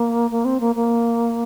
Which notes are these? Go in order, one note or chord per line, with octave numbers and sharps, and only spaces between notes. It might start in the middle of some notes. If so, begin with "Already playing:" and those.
Already playing: A#3
A#3
C4
A#3
A#3